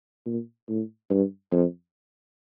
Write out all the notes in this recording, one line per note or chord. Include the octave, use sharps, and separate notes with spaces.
A#2
A2
G2
F2